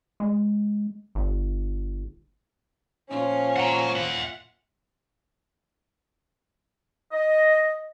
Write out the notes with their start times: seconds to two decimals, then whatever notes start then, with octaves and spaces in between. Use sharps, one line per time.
0.20 G#3
1.15 G1
3.10 A#2 F3 C#4 F4
3.56 F#5 A#5
3.96 E5 F#5
7.12 D#5